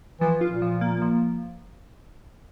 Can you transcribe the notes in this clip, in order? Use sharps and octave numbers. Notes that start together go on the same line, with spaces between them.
E3 F3
F4
A#2
F3
A#3
F3